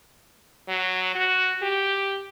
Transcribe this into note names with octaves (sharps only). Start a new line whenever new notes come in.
F#3
F#4
G4